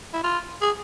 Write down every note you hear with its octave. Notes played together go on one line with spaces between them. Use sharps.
E4
F4
G#4